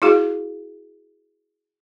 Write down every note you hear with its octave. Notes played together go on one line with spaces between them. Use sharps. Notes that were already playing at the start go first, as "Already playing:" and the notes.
E4 F#4 G#4 F5